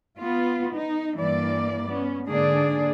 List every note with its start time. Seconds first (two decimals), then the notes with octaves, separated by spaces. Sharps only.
0.18 B3 F4
0.73 D#4
1.17 G2 E3 A#3 D5
1.89 B3 C#4
2.27 G#2 D3 A#3 D4 G#4 D5